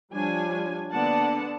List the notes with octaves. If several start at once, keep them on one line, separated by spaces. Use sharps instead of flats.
F3 G3 D4 C#5 G#5
D3 A#3 B3 D5 F#5 A5